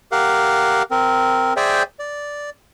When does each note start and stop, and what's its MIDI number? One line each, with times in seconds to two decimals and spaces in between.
0.12 0.83 67
0.12 0.83 70
0.12 0.83 77
0.12 0.83 78
0.91 1.53 60
0.91 1.53 70
1.57 1.83 68
1.57 1.83 72
1.57 1.83 74
1.57 1.83 76
1.57 1.83 79
1.57 1.83 80
1.99 2.50 74